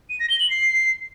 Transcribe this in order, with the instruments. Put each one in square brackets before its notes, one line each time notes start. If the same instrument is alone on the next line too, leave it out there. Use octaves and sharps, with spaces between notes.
[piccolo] D#7
A#6
G7
F#7
C7